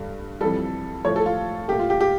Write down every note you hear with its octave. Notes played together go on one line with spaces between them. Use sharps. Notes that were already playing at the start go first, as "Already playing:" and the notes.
Already playing: G2 D3 G3
F2 E3 G3 A4
A2 F3 A3 C#5
A4
F4
A#2 A3 G4
F4
G4
G4